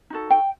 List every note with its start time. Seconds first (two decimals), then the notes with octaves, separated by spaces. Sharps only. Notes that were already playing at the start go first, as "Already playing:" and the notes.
0.10 D#4 F#4 A4
0.31 G5